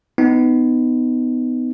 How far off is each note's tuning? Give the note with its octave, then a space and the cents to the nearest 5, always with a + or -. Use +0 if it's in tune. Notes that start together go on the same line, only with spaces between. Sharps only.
B3 +25 D#4 +0